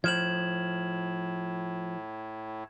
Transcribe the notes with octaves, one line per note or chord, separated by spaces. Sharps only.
A2 F3 G#6 E7 F#7